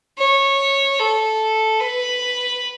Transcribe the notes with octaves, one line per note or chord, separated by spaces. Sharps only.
C#5
A4
B4